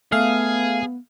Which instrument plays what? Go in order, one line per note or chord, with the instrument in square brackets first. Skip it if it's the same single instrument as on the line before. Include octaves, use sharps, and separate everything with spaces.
[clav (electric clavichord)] A3 [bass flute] B3 [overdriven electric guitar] G#4 [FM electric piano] F5